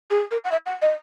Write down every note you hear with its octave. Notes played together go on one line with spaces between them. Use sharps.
G#4
A#4
F#5
E5
F#5
D#5